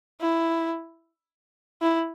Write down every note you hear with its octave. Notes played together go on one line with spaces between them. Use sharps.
E4
E4